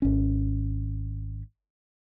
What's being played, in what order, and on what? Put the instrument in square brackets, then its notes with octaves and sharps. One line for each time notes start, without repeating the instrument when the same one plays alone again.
[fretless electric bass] G#1 C#4